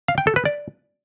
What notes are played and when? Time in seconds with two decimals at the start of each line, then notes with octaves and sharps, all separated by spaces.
0.08 F5
0.18 G5
0.27 A4
0.36 B4
0.45 D5